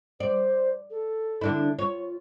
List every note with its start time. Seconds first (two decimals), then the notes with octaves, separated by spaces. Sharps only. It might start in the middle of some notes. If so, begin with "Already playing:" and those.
0.20 C5 D5
0.91 A4
1.41 D3 D4 E4
1.79 F4 C#5